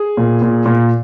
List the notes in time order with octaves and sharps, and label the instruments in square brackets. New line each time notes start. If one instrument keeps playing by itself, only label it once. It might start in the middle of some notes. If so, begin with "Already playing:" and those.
Already playing: [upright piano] G#4
[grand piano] A#2
A#2
A#2